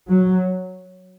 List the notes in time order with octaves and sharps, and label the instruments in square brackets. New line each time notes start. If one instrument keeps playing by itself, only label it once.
[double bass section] F#3